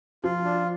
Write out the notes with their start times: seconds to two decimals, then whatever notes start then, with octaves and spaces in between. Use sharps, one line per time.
0.24 F3 F4
0.44 D4